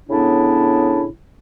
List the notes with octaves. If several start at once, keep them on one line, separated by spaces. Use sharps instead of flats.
A2 C#3 B3 D4 E4